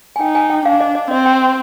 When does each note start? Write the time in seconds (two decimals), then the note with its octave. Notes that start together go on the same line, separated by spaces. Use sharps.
0.16 G#5
0.20 D#4 G5
0.35 G#5
0.50 G5
0.65 D4 F5
0.81 D#5
0.95 D#5
1.11 C4 D#5
1.26 G5